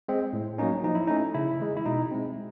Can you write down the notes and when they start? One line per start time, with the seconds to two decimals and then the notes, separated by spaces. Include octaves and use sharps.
0.08 G#3 C4
0.33 A2
0.58 F#3 A#3 C#4 D#4
0.84 F3 D#4
0.95 E4
1.07 A3 C#4 D#4
1.34 C#3 E4
1.59 E3 G#3
1.77 E4
1.86 B2 D#4
2.11 G#3 C4